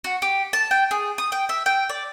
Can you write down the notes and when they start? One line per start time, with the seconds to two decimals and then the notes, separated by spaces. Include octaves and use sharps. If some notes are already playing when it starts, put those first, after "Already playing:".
0.04 F#4
0.22 G4
0.53 A5
0.71 G5
0.91 G#4
1.18 D#6
1.32 G5
1.49 E5
1.66 G5
1.89 D5